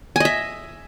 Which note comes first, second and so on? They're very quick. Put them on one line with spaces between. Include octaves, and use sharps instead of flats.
G#5 D#5 E5